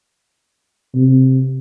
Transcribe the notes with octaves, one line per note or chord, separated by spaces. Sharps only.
C3